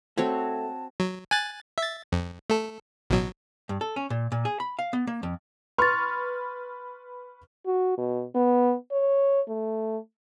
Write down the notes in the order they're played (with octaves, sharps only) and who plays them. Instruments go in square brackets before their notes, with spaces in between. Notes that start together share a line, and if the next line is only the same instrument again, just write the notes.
[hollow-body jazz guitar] A3 [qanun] C4 F#4 C#5 [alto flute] A5
[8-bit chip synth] F#3
G#5 F#6 A6
E5 A6
F2
A3 A4
A1 B2 F#3
[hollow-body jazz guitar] G2
A4
C#4
A#2
A#2
G#4
B5
F5
B3
A#3
F2
[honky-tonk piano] B4 C#6 F6 [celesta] C6 A6
[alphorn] F#4
B2
B3
C#5
A3